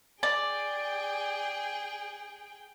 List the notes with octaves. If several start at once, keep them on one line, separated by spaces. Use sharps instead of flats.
G#4 D5 G5